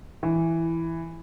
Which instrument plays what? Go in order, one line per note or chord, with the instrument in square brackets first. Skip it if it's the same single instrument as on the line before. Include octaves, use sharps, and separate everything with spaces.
[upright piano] E3